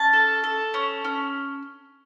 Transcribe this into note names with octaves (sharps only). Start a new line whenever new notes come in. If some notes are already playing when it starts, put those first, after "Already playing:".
Already playing: C#4 A5
A4
A4
C#4
C#4